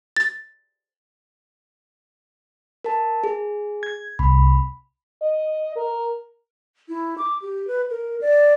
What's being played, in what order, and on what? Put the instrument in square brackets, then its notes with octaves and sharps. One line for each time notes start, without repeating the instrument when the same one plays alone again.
[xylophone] A6
[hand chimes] A#4 A5
G#4
[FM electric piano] G#6
[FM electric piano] C2 [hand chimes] B5
[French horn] D#5
A#4
[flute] E4
D6
G4
B4
A#4
D5